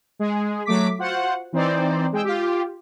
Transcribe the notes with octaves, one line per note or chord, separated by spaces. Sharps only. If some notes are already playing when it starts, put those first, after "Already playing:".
G#3 G#4
F#3 A3 D6 B6
F4 F#4 C5 F#5
E3 C4 D#4 C5 D5
G#3 G5 E6
F4 G4